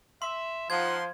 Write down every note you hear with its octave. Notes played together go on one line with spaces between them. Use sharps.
E5 C6
F3 D#4 F#5 C6 G#6